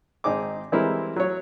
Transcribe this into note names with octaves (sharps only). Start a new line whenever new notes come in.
G#1 C4 D#4 G#4 D6
E3 G3 G#3 C4 E4 A#4
F#3 C#5